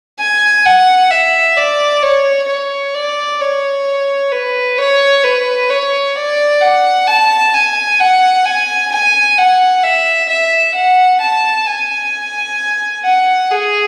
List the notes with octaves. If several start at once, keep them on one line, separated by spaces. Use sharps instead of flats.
G#5
F#5
E5
D5
C#5
C#5
D5
C#5
B4
C#5
B4
C#5
D5
F#5
A5
G#5
F#5
G#5
G#5
F#5
E5
E5
F#5
A5
G#5
F#5
G#4